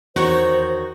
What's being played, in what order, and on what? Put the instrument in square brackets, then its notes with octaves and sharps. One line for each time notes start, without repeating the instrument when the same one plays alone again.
[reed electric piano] E2 [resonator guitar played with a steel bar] D#3 C#5 [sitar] F#4 [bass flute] C5